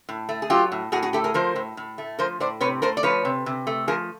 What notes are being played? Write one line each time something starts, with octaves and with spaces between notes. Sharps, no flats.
A2
A3
G#4
F#3 F4 G4
A2
A2 F#4 G#4
F#4 G#4
A3 G4 A4
G#4 A#4
F3 A#4 C5
A2
A2
A3
F3 A#4 C5
A2 C5 D5
C3 B4 C#5
A3 A#4 C5
D5
F3 B4 C#5
C3
C3
A3
F3 G#4 A#4